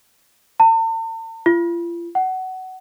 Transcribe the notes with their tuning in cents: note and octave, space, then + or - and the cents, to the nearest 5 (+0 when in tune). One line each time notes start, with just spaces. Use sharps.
A5 +45
F4 -40
F#5 +20